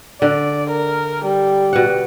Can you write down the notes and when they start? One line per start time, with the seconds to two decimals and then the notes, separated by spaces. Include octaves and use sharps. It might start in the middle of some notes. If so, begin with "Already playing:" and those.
0.22 D3 D5
0.70 A#4
1.25 G3
1.73 B2 F#5